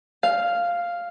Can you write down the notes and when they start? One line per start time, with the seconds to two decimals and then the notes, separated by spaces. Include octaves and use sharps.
0.23 F5